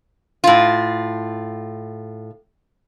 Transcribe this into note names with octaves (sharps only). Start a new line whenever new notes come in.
A2 F4